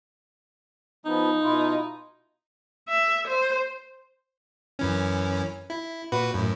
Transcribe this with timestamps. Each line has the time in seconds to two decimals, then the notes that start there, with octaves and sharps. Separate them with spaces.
1.06 F3 B3 D#4
1.43 B2 E4 F4
2.89 E5
3.27 C5
4.79 F#2 E3 C#4
5.70 E4
6.12 A#2 F#4 B4
6.34 F#2 A2